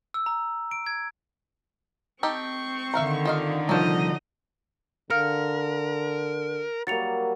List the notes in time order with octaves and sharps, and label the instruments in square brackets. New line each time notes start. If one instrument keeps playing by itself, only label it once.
[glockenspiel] E6
A#5
D7
G#6
[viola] C4 C#6 [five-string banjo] D#4 G4 A4
[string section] D3 D#3 [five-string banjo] E5 F5 A#5
[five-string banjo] F4 D#5 F5
[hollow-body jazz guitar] C2 F3 [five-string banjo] F#3 A5 [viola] D#4 D#5
[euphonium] D3 [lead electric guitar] A#4 [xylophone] F5 F6 C#7
[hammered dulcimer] F#3 G3 A#3 [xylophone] A6 C#7 F7